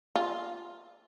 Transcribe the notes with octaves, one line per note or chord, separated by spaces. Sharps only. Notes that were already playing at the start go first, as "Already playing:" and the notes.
F4